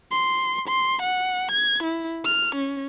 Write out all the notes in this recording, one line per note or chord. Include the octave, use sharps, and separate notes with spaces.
C6
C6
F#5
G#6
E4
F6
C#4